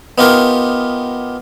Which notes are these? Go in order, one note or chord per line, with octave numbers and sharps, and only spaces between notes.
B3 D#4 F4 G4 A#4